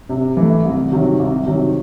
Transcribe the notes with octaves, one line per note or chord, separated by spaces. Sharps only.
C3
E3 A3
C2
C3 D#3 F#3
C2
C3 D#3 F#3